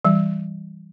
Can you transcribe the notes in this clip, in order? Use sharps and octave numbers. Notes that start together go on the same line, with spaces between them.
E3 G3